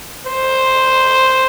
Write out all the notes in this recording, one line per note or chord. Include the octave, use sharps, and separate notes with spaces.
C5